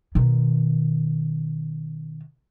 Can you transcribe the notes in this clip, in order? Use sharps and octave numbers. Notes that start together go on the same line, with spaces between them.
B2 D#3